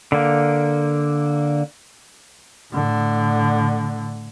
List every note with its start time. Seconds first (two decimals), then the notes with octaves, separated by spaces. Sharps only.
0.12 D3 A#3
2.72 A2 D3